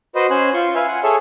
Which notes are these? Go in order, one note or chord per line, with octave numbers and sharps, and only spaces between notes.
F#4 B4 C5 D#5
C#4 C5 G#5 F#6
F4 C6 C#6
B4 E5 F5 G#5
F#5 G#5
G#4 A4 C#5 E5